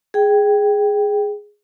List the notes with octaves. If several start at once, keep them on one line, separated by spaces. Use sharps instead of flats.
G#4 G5